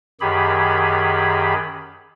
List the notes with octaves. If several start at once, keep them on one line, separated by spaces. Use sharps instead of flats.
F#2 D#3 G4 G#4 B5